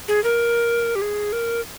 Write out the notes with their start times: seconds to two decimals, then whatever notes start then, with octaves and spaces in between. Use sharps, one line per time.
0.08 G#4
0.24 A#4
0.95 G4
1.02 G#4
1.33 A#4